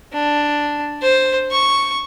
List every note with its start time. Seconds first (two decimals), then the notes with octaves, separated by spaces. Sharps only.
0.13 D4
1.02 C5
1.51 C#6